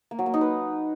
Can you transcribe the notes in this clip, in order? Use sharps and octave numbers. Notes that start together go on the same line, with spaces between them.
A#3
F#3
A#3
D#4
B4